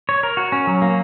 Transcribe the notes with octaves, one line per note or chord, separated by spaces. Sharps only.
C#5
A#4
F#4
C#4
F#3
A#3